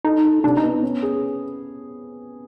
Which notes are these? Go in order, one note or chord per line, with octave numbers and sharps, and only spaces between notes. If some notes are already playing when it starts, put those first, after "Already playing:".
D#4 A4
A4
C3 D4
D#4
B3
C#4
G#4